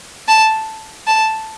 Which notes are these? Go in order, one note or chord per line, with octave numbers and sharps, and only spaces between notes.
A5
A5